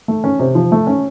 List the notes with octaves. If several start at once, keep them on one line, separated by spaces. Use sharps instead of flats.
A3
C#4
C3
F3
A3
C#4